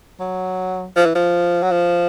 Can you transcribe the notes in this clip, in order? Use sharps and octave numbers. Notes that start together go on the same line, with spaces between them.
F#3
F3
E3
F3
F#3
F3